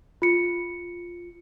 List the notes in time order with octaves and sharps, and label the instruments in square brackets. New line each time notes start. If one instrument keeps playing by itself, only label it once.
[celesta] F4 C#7